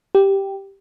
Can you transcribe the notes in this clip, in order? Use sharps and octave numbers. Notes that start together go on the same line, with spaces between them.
G4